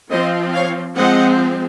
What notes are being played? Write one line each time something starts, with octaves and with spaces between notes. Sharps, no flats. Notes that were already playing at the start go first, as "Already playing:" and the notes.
F3 C4 C5 D#5
C#5 F5
F3 G#3 C4 D#5 F#5